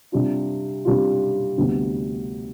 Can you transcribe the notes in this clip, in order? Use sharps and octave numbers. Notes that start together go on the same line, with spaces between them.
C3 G3 D4 F4
C3 G3 D4 F4
D2 C3 G3 B3